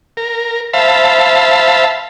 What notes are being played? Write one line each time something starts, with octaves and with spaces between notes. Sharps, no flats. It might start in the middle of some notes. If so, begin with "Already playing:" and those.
A#4
C5 E5 F5 A5 B5